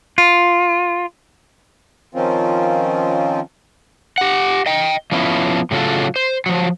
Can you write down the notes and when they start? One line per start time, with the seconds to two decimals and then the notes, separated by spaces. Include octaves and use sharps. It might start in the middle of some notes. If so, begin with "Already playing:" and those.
0.18 F4
2.15 D#3 F3 C4 C#4 F4
4.18 G4 F#5
4.66 D#5 G5
5.12 F3 B3 C#4 E4
5.71 A2 C#3 F#3 F4 A4
6.16 C5
6.46 F3 F#3